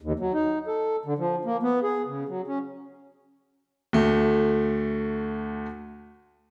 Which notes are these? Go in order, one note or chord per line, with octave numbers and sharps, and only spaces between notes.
D#2
F#3
D#4
A4
D3
F3
A#3
B3
G#4
C#3
F#3
C#4
D2 A3